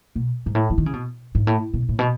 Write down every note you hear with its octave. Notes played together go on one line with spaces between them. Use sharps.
B2
G#2
A2
E3
D#3
C#3
B2
G#2
A2
B2
A2
B2